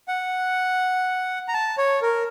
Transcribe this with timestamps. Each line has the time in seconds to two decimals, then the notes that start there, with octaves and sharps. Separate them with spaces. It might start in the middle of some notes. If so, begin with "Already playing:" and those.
0.08 F#5
1.48 A#5
1.54 A5
1.78 C#5
2.02 A#4